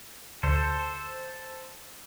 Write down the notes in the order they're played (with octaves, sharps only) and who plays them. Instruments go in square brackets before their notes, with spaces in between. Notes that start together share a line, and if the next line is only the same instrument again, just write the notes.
[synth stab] D2 [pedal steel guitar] A4 C5